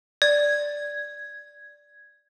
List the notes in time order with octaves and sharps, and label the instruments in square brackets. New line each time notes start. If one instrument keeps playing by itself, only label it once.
[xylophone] D5 [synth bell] G#6